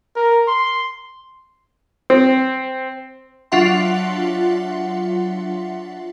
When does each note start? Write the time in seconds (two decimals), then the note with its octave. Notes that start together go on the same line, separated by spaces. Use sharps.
0.16 A#4
0.48 C6
2.10 C4
3.52 F#3 D4 F4 E5 F#5 C6